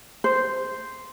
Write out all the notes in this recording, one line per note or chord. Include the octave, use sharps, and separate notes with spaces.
C5